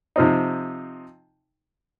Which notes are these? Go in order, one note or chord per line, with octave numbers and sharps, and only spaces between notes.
C3 F3 C4 D#4